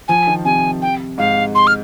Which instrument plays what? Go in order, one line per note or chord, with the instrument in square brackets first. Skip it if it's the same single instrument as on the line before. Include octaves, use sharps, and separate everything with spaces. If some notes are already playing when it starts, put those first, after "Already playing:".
[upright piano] F3 [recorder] G#5
[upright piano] D#3
[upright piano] C3 [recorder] G#5
[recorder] G5
[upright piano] G#2 [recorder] F5
[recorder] C6
F6